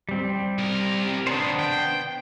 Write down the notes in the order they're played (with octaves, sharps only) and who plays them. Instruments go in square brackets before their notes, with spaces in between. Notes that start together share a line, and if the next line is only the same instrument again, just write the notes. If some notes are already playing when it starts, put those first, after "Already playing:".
[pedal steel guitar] G3 C4
[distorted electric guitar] C2 A#4
[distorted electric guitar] C3 D#3 [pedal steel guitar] B3 D4 C5
[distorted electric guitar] G5